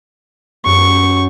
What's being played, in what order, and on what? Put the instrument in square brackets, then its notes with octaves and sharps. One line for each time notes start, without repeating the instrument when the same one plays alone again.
[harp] F#2 [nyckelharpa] C#6